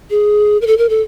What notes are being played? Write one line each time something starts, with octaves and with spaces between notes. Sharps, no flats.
G#4
A#4
A4
A#4
A4